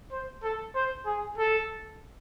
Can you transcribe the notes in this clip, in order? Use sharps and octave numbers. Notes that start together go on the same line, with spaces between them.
C5
A4
C5
G#4
A4